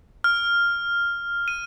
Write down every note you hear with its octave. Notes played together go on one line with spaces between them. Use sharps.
F6
D#7